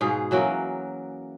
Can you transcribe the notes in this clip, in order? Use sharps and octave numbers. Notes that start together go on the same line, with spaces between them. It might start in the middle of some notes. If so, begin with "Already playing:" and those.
G#2 B2 G#4 F5
E3 F#3 A#3 C#4